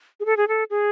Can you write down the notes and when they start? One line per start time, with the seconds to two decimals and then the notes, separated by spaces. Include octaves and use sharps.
0.20 G#4
0.26 A4
0.37 G#4
0.48 A4
0.70 G#4